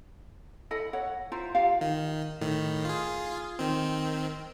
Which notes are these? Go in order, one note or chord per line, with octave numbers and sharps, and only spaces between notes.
E4 A4 D#5 B5
C#5 F#5
E4 F4 C5 A#5
F4 G4 F5
D#3
A2 D#3
F4 G#4
D#3 C4